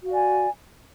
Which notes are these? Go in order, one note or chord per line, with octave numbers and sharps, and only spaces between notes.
F#4 D5 F5 G#5